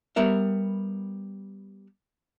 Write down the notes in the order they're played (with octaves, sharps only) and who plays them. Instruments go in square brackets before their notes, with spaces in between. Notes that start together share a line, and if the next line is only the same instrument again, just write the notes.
[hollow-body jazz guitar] G3 B3 A#4 E5